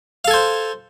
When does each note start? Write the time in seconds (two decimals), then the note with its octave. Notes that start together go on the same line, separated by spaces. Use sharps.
0.25 F5
0.28 A4
0.31 G#5
0.34 C5